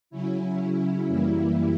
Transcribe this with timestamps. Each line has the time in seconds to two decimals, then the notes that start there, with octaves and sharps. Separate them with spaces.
0.10 C#3 F#3 C#4 E4
1.07 F#2 E3 G3 A#3 E4